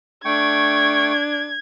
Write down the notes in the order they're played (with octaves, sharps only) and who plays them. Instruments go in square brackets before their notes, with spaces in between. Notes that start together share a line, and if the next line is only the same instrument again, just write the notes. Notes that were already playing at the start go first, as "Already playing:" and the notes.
[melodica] A3 G5 C#6 [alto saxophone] D4 [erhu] G#6